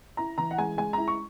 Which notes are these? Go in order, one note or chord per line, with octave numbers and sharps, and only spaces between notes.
E4 A#5
E3 A#5
F#5
G#3 G#5
G#3 G#5
E4 A#5
C#6